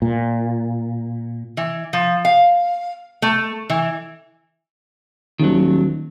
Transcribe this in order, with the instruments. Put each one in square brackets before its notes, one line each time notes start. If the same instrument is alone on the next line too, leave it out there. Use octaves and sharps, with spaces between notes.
[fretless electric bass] A#2
[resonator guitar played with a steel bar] E3
F3
F5
A3
E3
[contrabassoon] D#1 [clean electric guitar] D#3 F#3